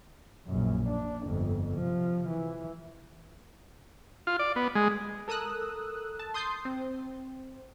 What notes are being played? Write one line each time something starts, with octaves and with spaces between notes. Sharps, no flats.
A#1 F#2
D4
G1 F2
C3 F3
E3
F4
D5
B3
G#3
A4 A#4 D#6 E6 F#6
A5
C6 D#6 G6 A6 C7
C4